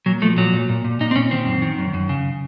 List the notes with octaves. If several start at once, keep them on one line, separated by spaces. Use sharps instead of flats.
A#2 F#3
F3 A3
A#2 F#3
A#2
A#2
A#2
A#2 D#4
C4
A#2 C#4
D#3 C4
F#2
D#3
F#2
F#2
C#3